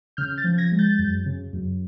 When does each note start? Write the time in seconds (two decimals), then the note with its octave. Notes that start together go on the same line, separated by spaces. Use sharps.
0.17 C#3 F6 G6
0.37 G6 A6
0.44 F3
0.58 G#6 A#6
0.72 G#3
0.79 G6 A6
0.99 F#2
1.26 C#3
1.53 F#2